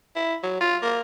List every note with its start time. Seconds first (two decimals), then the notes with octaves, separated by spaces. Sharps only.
0.16 E4
0.43 F#3
0.60 F4
0.82 A#3